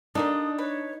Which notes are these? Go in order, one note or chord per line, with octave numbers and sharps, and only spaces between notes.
G3 A#3 D4 D#4 A4 D#6
B4 C#5